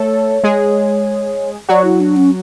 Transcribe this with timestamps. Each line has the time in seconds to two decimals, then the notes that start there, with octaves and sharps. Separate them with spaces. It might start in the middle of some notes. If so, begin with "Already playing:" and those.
Already playing: A3 A4 C#5
0.44 G#3 G#4
1.69 F#3 F#4 D5
1.84 E4
2.00 D4
2.16 C#4